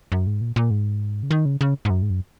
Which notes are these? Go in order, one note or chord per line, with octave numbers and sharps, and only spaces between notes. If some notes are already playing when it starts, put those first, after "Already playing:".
F#2
G#2
A#2
A#2
G#2
C#3
D#3
C#3
C#3
G#2
F#2
G#2
F#2